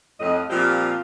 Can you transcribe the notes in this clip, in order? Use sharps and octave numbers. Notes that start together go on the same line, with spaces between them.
F2 A2 D#5
A#2 F3 G3 C4 F4 G4